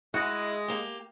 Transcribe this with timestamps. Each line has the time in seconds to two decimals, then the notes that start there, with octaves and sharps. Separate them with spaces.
0.14 G#3 E4 F#4
0.68 A#3 G4